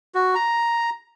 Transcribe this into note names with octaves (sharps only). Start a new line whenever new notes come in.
F#4
A#5